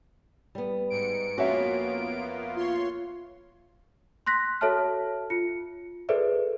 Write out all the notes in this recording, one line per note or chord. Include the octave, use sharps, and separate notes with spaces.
G3 B3
G#2 C#7 D7
F2 A#3 B3 C#4 F4 F#4 E5
F4 C#5 C6
C6 F#6 A#6 B6
F#4 A4 C#5 E5 A5 F6
F4 C#7
G#4 A4 B4 C5 D5 E5